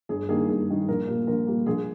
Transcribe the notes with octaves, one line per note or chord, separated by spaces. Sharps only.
G1 G#4
G2 D#3 G3 A#3 G#4
G1 G#4
G2 D#3 G3 A#3
A#1 A#4
A#2 G3 A#3
A#1 A#4
A#2 G3 A#3
A#1 G#4